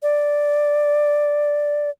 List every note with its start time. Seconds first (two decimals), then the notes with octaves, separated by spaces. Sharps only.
0.03 D5